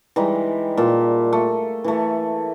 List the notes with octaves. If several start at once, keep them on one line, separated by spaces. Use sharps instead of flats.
E3 G3 G#3 D#4
A#2 A5
A3
E3 A3